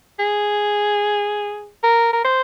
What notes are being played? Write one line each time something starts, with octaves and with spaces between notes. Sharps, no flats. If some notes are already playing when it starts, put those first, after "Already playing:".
G#4
A#4
A#4
C5